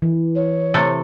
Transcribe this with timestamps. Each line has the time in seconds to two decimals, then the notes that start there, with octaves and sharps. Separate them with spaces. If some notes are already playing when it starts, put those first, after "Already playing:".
0.02 E3
0.36 C#5
0.74 C3 A3